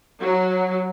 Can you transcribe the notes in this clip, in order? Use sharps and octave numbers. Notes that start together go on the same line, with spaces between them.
F#3